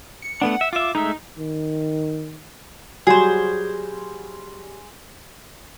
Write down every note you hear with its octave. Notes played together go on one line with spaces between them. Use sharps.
C#7
A3 B3 D4 F#5
E5
F4 E5 D6
G#3 A3 D#4 E5
D#3
F#3 G3 F#4 G#4 C5